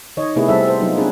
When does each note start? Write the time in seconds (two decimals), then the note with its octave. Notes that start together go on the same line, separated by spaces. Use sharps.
0.17 D#3 C#5 D#5
0.36 C3 A3 B3 E4 G#4 B4
0.48 G3 C4 A4 E5
0.68 C5
0.81 F#3 B3 D#4 F4
0.97 B3 C#4 D4 G#4 B4